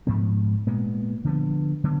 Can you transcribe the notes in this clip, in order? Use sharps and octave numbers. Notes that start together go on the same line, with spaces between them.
G#2 F3 B3
A#2 G#3 B3
D3 F3 B3
D3 F#3 B3